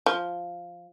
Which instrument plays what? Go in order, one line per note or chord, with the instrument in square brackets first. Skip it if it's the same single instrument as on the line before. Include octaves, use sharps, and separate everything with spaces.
[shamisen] F3